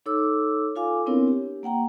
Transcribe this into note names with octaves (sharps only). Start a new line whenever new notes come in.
D#4 A4 C#5 D6 E6
F4 A4 F5 G#5 D6
B3 C4 D4 E4 A#4 C#5
G4
A#3 F#5 G5 A#5